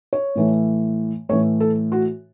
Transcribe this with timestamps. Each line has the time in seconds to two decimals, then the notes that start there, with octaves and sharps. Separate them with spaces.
0.13 C#5
0.36 A2 E3 A3
1.29 A2 E3 A3 C#5
1.60 A4
1.92 F#4